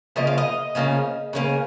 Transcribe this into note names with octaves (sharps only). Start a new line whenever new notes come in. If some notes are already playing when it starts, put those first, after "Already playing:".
C#3 F3 A#3 D#5
F5
D#5
C#3 F3 A#3 C#4
C#3 F3 A#3 C#4